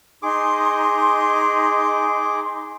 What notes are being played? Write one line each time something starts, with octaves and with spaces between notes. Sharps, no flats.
D#4 G#4 C6 D6